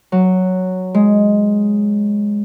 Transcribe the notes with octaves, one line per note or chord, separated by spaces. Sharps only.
F#3
G#3